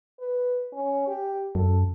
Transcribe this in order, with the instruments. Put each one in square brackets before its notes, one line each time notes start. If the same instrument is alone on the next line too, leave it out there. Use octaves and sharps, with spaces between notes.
[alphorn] B4
C#4
G4
[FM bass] F#2 [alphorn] A4